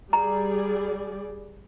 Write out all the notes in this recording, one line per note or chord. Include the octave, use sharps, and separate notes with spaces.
G3 G#4 D5 A#5